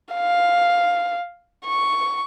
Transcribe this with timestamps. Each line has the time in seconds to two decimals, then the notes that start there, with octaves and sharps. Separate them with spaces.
0.14 F5
1.67 C#6